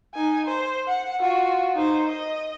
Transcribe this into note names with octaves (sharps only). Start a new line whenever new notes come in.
D#4 G#5
C5
F#5
F4 F#4
D#4 C5
D#5